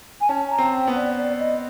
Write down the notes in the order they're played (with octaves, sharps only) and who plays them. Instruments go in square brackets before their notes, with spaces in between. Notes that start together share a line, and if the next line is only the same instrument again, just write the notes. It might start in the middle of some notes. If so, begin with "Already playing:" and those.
[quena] G#5
[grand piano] C#4 [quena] A5
[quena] A#5
[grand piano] C4
[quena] G5
[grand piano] B3
[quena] D5
D5
D#5